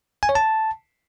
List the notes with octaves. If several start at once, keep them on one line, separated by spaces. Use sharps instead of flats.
G#5
C#5
A5